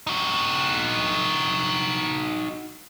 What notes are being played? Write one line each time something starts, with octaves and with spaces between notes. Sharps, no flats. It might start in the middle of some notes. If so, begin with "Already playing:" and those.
D#4 F#4